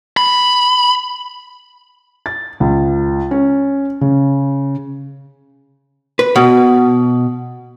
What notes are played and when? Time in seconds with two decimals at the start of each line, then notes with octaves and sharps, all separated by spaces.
0.17 B5
2.26 A6
2.60 C#2
3.31 C#4
4.01 C#3
6.19 B4
6.36 B2